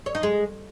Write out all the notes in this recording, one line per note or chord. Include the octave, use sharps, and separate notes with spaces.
C#5
D#4
G#3